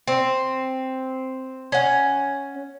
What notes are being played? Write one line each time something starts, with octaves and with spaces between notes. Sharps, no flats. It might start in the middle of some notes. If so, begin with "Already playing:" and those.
C4
C#4 F#5